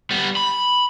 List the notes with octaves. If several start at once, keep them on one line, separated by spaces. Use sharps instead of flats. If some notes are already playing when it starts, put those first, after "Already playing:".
G3 B3
B5